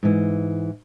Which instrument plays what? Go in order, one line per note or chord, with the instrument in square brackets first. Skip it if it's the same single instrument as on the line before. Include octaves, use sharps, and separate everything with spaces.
[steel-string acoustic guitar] G#2 E3